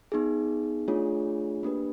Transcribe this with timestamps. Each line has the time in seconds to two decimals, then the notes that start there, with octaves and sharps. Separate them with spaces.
0.12 B3 D#4 G#4
0.88 A3 D4 F4 G#4 C#5
1.63 A#3 D4 G4 B4